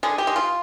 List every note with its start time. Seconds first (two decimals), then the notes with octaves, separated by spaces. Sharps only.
0.03 D3 G#4
0.18 G4
0.27 G#3
0.36 F4